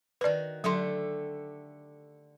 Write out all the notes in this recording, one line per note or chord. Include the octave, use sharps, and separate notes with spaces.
D#3 F#4 B4 D5
D3 F#3 A3 G4 C6